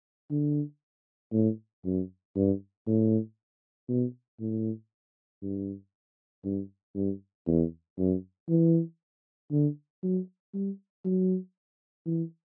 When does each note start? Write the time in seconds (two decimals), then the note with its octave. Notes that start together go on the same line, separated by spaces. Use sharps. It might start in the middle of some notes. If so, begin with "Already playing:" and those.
0.30 D3
1.33 A2
1.85 F#2
2.36 G2
2.87 A2
3.89 B2
4.40 A2
5.42 G2
6.45 G2
6.95 G2
7.47 E2
7.98 F#2
8.49 E3
9.51 D3
10.03 F#3
10.54 G3
11.05 F#3
12.06 E3